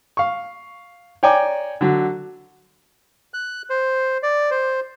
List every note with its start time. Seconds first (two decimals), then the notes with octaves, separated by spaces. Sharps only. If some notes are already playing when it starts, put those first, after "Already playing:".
0.17 F5 C#6
1.23 C#5 D5 G5 G#5 A#5 D6
1.81 D3 F#3
3.34 F#6
3.70 C5
4.23 D5
4.51 C5